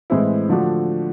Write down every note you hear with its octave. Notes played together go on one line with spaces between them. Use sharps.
A2 E3 G#3 C4 E4
D3 F3 A3 D4 F#4